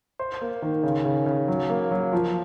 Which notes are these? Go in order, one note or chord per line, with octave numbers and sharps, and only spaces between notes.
C5
A#3
D#3
C#3
C#3
C#3
F#3
A#3
F#3
F3